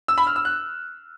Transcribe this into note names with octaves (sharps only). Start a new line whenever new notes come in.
E6
B5
F6
E6
F#6